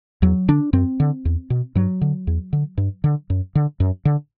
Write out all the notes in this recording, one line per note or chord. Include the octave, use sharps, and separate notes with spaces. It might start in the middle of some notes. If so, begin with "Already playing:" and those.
E2 F#3
D3 D4
F#2 C4
D3
E2
B2
G2 F#3
D3
E2
D3
G2
D3
F#2
D3
F#2
D3